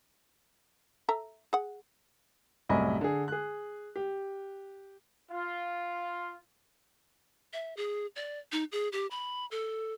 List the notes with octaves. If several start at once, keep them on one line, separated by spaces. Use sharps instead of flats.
A4 E5 A#5
G#4 F#5
C2 F#2 A2 D#5 G#5 B5
D3 G#4
G#4 F#6
G4
F4
E5
G#4
D5
D#4
G#4
G4
B5
A4